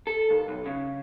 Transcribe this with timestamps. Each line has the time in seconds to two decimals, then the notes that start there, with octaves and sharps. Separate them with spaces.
0.07 A4
0.30 D#2
0.48 B1
0.66 C#3